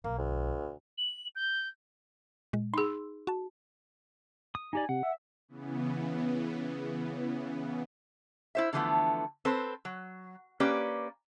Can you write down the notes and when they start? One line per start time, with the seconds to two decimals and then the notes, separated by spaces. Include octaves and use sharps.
0.04 B1 A#3
0.18 D2
0.98 F#7
1.35 G6
2.53 A#2 G#3
2.74 D#4 G#4 C6 E6
3.27 F#4 A5
4.55 D#6
4.73 D#4 G4 D5 G#5
4.89 C3 F#5
5.03 E5
5.48 C#3 E3 B3
8.55 E4 C5 E5
8.73 D3 E3 F3 G#3 A3 B3
9.45 C4 A4 B4 C5
9.85 F#3
10.60 A#3 C#4 G4 B4 D5